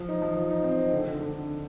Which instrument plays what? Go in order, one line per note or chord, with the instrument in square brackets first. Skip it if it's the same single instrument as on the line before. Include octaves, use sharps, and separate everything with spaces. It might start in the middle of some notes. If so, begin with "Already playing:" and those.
Already playing: [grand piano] F3
D#4
F3
F3
D#4
C4
D#4
D3
D3
D3